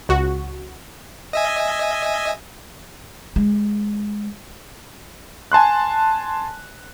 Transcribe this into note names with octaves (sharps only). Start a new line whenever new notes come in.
C#2 F#4
D#5 E5 G#5
G#3
G#5 A5 C6 F#6